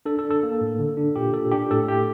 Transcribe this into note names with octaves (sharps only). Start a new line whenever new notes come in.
D4 A4
A4
D4
A4
A#3
A2
D3
D4
A#2 G4
A#2 A4
D4 G4
A2 A4
A3 G4